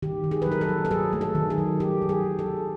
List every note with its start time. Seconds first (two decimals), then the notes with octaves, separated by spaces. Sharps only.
0.02 D#3 G4
0.24 D#3
0.31 G#4
0.42 F#3 B4
0.52 A#4
0.61 A4
0.69 F#3
0.85 A4
0.91 F#3 G#4
1.13 A3
1.21 A4
1.35 D#3
1.50 G#4
1.58 F#3
1.80 F#3 G4
2.02 F#3
2.09 G#4
2.24 D#3
2.39 A4
2.46 D#3